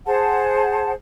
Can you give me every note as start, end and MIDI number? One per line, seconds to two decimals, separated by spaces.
0.06 0.92 68
0.06 0.92 72
0.06 0.92 78
0.06 0.92 81